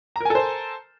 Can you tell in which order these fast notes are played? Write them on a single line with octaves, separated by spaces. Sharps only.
A#5 A#4 G#5 A4 C5